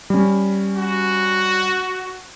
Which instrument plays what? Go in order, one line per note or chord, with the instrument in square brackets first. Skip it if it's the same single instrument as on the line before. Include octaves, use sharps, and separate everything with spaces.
[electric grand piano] G3 C#4
[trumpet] F#4